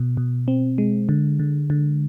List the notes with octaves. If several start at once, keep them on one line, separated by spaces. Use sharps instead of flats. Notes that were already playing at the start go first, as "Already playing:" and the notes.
Already playing: B2
B2
C4
G#3
D3
D3
D3